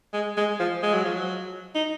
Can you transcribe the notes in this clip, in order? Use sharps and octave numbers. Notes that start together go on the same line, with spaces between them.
G#3
G#3
F3
G#3
F#3
F3
F#3
D#4